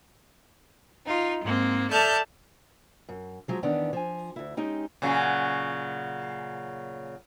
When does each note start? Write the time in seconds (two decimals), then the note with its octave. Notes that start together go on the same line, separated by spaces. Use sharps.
1.05 D#4 F4
1.41 G#2 G#3 A#3 C4
1.91 A4 D5 E5 A5 F6 G6
3.09 F#2
3.48 F3 F#3 G#3
3.63 E2 D#3 E3 B3 C#4 D4
3.93 F3 G#5
4.36 D2 E4
4.57 G#3 C#4 D#4 G4
5.02 A#2 C#3 F#3